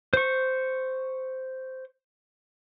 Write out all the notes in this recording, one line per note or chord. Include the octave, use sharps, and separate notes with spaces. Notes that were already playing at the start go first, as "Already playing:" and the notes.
C5 C#6